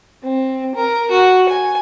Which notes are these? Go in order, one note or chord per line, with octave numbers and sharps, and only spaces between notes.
C4
A#4
F#4
G#5